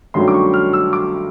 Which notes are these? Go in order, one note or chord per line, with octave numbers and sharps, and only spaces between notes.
G2 D#3 F#3 A3 C#4 C6
D6
C#6
F6
E6
D6